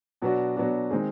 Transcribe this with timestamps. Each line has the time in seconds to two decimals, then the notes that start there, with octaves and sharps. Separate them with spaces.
0.22 B2 F#3 B3 D4 F#4
0.56 B2 F#3 B3 D4 F#4
0.91 D#3 G#3 C4 D#4 G#4